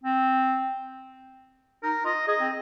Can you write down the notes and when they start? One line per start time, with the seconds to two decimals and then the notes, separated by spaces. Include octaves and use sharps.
0.04 C4
1.83 D#4 A#4
2.04 F4 D#5
2.27 G#4 D#5
2.40 C4